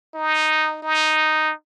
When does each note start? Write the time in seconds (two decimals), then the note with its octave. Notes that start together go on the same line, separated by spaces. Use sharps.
0.14 D#4
0.82 D#4